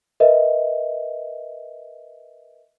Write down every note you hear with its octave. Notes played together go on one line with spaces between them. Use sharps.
A#4 B4 D#5 E5